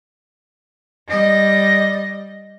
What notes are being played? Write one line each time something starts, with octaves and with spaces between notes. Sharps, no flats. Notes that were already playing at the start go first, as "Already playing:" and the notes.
G3 D#5